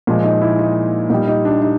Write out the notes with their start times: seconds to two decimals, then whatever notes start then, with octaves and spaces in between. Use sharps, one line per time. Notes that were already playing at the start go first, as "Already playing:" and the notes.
0.07 A#2 F3 G#3
0.24 D#4
0.42 E4
0.59 D#4
1.10 A#2 G3 D#4
1.28 D#4
1.45 D4
1.62 D#4